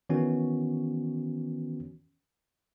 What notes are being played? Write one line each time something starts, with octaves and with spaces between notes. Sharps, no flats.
D#3 E3 B3 C#4 F#4